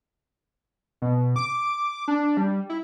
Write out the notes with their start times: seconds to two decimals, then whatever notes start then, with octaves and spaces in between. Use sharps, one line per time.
1.02 B2
1.36 D6
2.08 D4
2.37 G3
2.70 E4